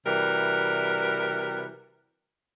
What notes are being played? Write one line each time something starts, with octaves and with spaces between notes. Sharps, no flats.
C3 E3 G3 F#4 A#4